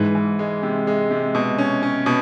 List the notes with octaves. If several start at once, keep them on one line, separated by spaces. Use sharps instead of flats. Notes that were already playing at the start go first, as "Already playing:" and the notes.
Already playing: G#2 E3
E3
G#3
C3
G#3
C3
B2
C#4
C#4
B2